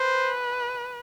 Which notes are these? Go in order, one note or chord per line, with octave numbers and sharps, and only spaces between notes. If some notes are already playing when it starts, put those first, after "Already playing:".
Already playing: B4 C5